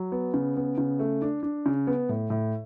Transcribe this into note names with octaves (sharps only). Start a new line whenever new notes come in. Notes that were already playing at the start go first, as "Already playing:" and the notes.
Already playing: F#3
B3
C#3
B3
C#3
A3
D4
D4
C#3
B3
A2
A2